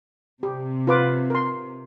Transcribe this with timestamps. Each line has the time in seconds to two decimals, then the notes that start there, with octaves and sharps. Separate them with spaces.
0.43 C3 G4
0.87 F4 B4 D6
1.30 A#4 C6